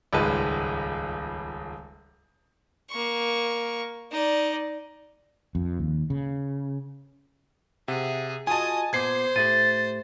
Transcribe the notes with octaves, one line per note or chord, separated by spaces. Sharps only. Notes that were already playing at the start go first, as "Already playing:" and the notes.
D#1 C#2 G#2 G#3 B4 A5
A#3 C#6
D#4 D5
F2
D#2
C#3
C3 G#4 E5 F#5
F4 F#4 D#5 G#5 A5 D#6
A#2 B3 C5 D6 G#6 C7
A2 A3 G4 A6 D#7